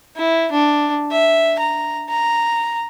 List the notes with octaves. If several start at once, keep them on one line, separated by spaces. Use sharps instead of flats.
E4
D4
E5
A#5
A#5